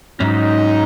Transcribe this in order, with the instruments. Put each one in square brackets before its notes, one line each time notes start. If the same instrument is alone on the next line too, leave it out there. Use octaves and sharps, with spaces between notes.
[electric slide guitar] G#2 F#3 C#4 [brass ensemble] D#4